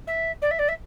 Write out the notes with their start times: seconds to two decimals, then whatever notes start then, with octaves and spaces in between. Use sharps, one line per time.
0.07 E5
0.42 D5
0.51 E5
0.59 D5
0.69 E5